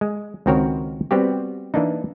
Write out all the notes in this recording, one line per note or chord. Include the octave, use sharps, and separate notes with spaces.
G#3
C#2 D#3 C4 F#4 A#4 C#5
G3 B3 C4 F#4 G4
E3 A#3 D4 D#4